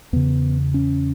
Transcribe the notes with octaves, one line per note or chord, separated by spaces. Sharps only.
E2 C#3 B3
C#4